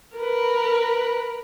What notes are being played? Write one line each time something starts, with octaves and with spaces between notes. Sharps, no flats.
A#4 B4